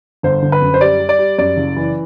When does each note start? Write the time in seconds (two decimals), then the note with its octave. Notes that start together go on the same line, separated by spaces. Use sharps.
0.23 G1 C5
0.42 D3
0.52 B4
0.62 F#2
0.74 C5
0.81 G3 D5
1.00 G3
1.09 D5
1.19 G3
1.38 F#2 D5
1.57 F#1
1.76 E3